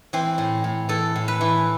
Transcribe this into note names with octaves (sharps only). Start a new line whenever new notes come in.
E3 C4
A2
A2
E3 A4
A2
B4
E3